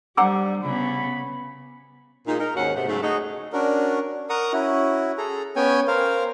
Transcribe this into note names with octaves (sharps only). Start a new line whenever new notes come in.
G3 D4 C5 F#5 A#5 D6 E6
C#3 B3 B5
A#2 G#3 D#4
D#4 A#4
D#2 G#2 C#4 F#4 F#5
G#2 C3 A3 F#5
G#2 C#3 F#3 A3
A3 D#4 F#4 G#4
C#4 D4 F#4 A#4
A#4 F#5 A#5 C#6 D#6
C#4 E4 F#4
G#4 A4 A#5
B3 C#4 C#5 G5 G#5
A#4 C5 F5